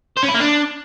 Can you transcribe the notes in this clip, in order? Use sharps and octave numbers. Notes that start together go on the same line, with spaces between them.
C5
C#4
E4
A#3
D4